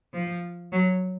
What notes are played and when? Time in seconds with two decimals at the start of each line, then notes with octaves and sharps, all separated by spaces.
0.13 F3
0.72 F#3